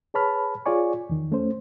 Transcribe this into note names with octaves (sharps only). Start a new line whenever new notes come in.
G#4 B4 C#5 A5 B5 F6
F4 G#4 C#5 D5 G#5 C#6
E2 D#3
A3 C#4 C5